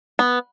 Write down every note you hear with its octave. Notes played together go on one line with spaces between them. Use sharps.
B3